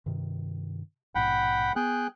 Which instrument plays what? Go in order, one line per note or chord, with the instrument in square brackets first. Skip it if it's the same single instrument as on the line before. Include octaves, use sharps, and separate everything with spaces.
[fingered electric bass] G2 C3 D#3
[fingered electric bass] A#1 G#2 B2 [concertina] F#5 G5 B5
[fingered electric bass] B3 [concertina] G#4 G5 F#6